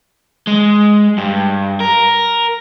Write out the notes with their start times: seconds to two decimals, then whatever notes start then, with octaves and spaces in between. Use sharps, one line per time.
0.47 G#3
1.18 G2
1.80 A#4